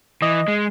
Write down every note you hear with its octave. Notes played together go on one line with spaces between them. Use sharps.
E3 D#5
G#3